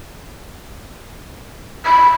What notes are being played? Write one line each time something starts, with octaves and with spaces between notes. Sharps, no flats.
B5